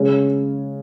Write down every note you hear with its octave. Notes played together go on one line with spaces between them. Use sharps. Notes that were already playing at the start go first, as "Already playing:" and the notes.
Already playing: C#3 G#3 C#4